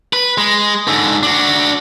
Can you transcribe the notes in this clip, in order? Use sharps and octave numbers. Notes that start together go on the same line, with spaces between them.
B4
G#3
G#2 D3
D4 F#4